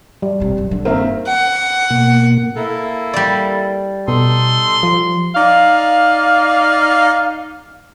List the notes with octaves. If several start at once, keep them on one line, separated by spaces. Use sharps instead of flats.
G3
D2 C3
D#1 F#2
D3
G1 D#3 A#3 C4 A#4 E5
F#5
B2 A#3
A#3 E4 A4
G3 D5
B2 D#4 A4 C6
F3
D#4 D5 F5